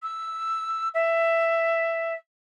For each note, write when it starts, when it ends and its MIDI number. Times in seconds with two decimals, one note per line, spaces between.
0.03 0.89 88
0.94 2.13 76